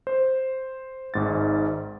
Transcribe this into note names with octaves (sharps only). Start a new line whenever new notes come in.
C5
G#1 G#2 A6